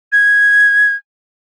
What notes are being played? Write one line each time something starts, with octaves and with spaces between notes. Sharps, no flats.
G#6